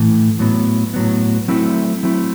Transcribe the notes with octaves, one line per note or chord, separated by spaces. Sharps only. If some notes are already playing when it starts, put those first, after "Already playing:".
Already playing: A2 E3 A3
A2 F#3 B3
A2 F#3 B3
F#3 A3 C4 E4
F#3 A3 C4 E4